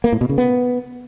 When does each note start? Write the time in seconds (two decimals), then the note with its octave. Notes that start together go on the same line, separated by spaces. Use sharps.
0.04 A#3
0.12 A2
0.21 B2
0.29 C#3
0.38 B3